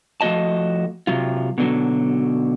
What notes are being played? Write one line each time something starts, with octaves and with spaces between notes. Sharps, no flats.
F3 A3 F#4 D#5 A5
C3 F#3 F4
B2 D3 F#3